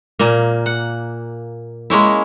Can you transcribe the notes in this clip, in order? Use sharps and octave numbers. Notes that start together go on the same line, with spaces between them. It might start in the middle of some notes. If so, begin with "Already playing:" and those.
A#2 A#3
F#5
G#3 A#3 C#4 E4